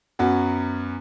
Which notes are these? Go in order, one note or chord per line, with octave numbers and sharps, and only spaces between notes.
F#2 F#3 B3